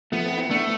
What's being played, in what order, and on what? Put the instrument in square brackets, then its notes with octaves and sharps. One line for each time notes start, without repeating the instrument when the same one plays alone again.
[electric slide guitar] F3 A3 [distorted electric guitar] B3
[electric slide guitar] A3 C4
C4 E4
[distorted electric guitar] A3 [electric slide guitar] B3 D4